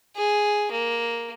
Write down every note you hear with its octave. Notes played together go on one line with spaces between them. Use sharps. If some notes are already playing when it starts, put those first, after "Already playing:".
G#4
A#3